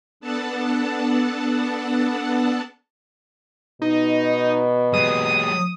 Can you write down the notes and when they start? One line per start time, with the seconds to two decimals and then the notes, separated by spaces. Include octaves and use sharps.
0.20 B3 D4 A4 F#5 A5
3.82 B2 D#4
4.94 F#3 G#3 D#6